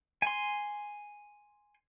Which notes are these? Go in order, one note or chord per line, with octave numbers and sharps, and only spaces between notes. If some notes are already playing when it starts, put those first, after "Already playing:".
G#5 C6